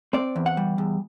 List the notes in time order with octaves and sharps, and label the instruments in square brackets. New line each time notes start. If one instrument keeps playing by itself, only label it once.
[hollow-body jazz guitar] C4 D5
E2
F#5
G3
E2